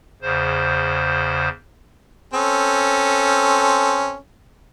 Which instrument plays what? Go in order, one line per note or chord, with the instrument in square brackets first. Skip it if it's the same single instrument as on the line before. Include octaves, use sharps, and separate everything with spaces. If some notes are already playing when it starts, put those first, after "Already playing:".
[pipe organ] E2 C#3 C5
[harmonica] C4 C#4 A4